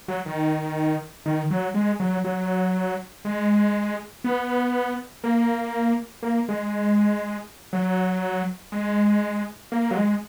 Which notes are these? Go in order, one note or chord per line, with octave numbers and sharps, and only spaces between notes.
F#3
D#3
D#3
F#3
G#3
F#3
F#3
G#3
B3
A#3
A#3
G#3
F#3
G#3
A#3
F#3
G#3